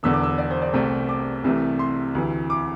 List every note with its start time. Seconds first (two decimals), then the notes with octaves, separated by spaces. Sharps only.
0.03 E1 E2 D3 E6
0.14 D6
0.23 E6
0.38 D5
0.51 C5
0.62 D5
0.73 C2 C3 A3 C4
1.09 D6
1.44 C2 C3 E3 A3
1.79 C6
2.15 D2 C3 E3
2.50 D6